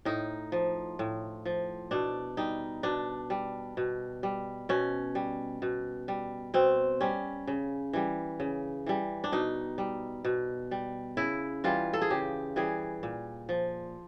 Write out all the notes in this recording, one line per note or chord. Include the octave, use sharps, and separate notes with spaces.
A2 D#4
F3
A2
F3
B2 D4
G3 D#4
B2 D4
G3
B2
G3
B2 C#4
G3
B2
G3
B2 C4
G3 C#4
C#3
E3 G3
C#3
E3 G3
D4
B2 D#4
G3
B2
G3
C#3 E4
E3 G3 F4
A4
G#4
C#3 G4
E3 G3 G#4
A#2
F3